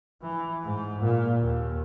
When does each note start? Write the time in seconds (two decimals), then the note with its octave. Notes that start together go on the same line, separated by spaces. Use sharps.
0.22 E3
0.64 G#2
1.02 A#2
1.40 D#2